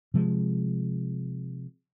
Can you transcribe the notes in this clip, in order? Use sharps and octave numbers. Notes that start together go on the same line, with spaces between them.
C3 F3 G#3